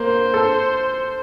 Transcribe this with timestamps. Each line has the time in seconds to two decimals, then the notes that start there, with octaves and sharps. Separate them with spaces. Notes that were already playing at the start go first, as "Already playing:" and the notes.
Already playing: A#3 C5
0.34 A4